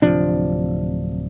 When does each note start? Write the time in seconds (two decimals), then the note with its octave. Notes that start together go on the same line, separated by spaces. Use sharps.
0.02 D1 C3 F3 D4